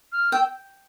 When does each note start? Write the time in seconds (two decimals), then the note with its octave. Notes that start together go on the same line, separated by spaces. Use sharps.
0.12 F6
0.32 G5 E6